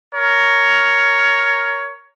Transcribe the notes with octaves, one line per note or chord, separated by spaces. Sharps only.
A#4 C#5